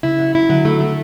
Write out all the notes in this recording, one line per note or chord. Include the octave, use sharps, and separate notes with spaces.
C#3 E4
F#3
E4
D3 F#3
A3
A3